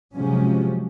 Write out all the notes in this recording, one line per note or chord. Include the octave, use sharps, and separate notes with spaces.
C3 F3 F#3 G#3 C#4